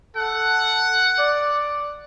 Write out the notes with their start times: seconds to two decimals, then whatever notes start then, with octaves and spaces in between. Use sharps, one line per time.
0.16 A4 F#5
1.19 D5